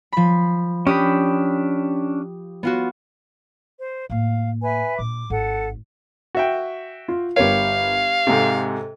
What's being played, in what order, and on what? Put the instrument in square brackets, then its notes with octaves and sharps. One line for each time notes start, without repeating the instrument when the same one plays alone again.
[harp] F3 B5
[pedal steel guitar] C#4 D4 B5 [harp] G4 D#6
[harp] B3 F4 F#4
[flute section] C5
[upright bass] A2 A#3 [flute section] F5
[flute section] B4 E5 G#5
[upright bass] A#2 D4 [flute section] D6
[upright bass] G#1 G#2 [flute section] A4 F#5
[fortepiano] F#4 E5 G5
[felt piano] F4
[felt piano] G1 A#4 [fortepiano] G4 C#5 [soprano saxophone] F5
[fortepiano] G#2 C3 [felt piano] A4